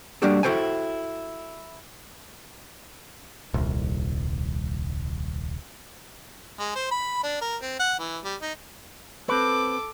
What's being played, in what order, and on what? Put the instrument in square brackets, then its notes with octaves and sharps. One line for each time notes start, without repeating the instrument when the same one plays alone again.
[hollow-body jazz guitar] G3 A#3 D4 F#4 G4 A4
E4 F#4 A4 C5 G5 G#5
[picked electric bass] D#1 C2
[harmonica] G#3
C5
B5
D4
A#4
C4
F#5
E3
G3
D#4
[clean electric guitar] C4 B4 [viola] A4 D6